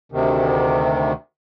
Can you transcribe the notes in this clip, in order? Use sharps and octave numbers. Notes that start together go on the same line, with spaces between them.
D2 C3 D#3